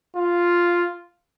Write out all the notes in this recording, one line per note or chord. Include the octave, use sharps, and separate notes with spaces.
F4